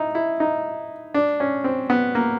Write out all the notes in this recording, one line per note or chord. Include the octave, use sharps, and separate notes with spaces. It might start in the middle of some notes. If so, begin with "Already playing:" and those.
Already playing: D#4 E4
E4
D#4
D4
C#4
C4
B3
A#3